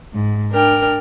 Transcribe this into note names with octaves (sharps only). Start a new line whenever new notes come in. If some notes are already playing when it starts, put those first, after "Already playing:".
G#2
D4 A#4 G5 F6